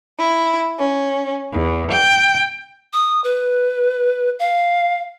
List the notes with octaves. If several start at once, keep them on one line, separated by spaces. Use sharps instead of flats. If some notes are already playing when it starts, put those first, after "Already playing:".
E4
C#4
E2
G5
D#6
B4
F5